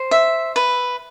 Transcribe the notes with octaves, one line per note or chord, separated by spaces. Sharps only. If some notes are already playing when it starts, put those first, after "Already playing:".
Already playing: C5
E5
B4